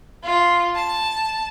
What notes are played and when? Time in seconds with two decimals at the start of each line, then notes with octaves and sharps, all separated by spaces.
0.23 F4
0.75 A5